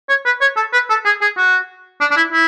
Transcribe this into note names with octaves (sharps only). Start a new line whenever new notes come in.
C#5
B4
C#5
A4
B4
A4
G#4
G#4
F#4
D4
D4
E4
E4